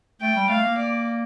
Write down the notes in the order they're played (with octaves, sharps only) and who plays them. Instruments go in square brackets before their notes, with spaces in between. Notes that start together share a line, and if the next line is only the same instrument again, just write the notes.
[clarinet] A3 [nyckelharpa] G5
[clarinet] G3
[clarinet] A3 [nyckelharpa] F5
[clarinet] A#3
[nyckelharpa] D5